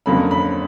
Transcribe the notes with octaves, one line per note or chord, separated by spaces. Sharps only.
F2 D3 F#3 A#3 C#4 B5
B5